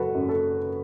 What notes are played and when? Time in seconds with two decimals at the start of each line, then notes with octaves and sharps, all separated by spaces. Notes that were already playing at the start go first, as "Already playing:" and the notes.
Already playing: F#1 F#3 F#4 A4 B4
0.15 F#2
0.29 A4